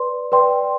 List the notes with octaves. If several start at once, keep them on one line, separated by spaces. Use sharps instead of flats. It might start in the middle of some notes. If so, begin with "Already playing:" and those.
Already playing: B4 D5 C6
B4 D5 G5 C6